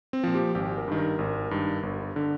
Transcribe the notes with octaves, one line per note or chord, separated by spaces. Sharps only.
C4
A#2 F3
G4
G#1 G4
A#4
G2 D#3
A#4
G#1
G2 D#3
G1
D3